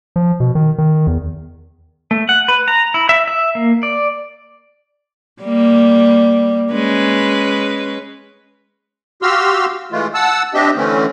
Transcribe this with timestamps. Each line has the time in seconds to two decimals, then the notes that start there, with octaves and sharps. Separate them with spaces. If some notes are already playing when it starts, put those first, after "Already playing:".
0.16 F3
0.40 B2
0.55 D#3
0.78 D#3
1.07 E2
2.11 A3
2.29 F#5
2.48 B4
2.68 A#5
2.94 E4
3.09 E5
3.28 E5
3.55 A#3
3.83 D5
5.42 G3 A#3
6.72 G#3 C#4 B4
9.22 F#4 G4 F5 C6 E6 F6
9.92 E3 G#3 A3 F4
10.14 F#5 A5 E6
10.54 C4 D4 G4 D#5 E5
10.77 D3 E3 A3 C4 C#4